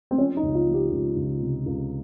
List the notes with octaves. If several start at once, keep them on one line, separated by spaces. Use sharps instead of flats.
C4
F3 C#4
D#4
C#2
F4
F3
G4
C#2
C#2
C3
C#2